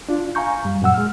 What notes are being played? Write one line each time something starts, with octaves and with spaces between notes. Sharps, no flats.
D4 F4
F5 G#5 A#5 C#6 G6
F#2 G3
F#2 A#2 F#5 E6
G#3 F6